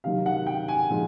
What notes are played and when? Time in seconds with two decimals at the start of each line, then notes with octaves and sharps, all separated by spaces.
0.04 C3 D#3 F#3 F5
0.26 F#5
0.46 G5
0.68 G#5
0.90 A#2 F3 G#3 C4 D#4